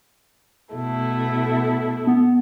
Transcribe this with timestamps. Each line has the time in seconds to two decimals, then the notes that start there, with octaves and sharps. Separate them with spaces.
0.73 B2 A3 E4
2.07 B3